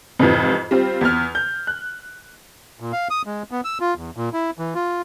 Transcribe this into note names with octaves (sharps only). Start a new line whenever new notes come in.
F2 G#2 C3 E3 F4
G3 C4 F4
E2 F6
G6
F#6
A#2
F5
D#6
G#3
B3
E6
F4
E2
A#2
E4
E3
F4